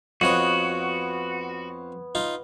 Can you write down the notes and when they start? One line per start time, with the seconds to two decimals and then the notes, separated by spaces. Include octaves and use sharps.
0.21 F2 F3 B3 F#4 C#5 D#5 F#5
2.15 D#4 F4